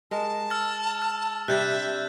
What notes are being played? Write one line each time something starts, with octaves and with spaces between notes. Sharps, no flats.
G#3 A#4 A5
E6 F6 A6
F6
C3 G3 D4 E5 F#6 G6 A6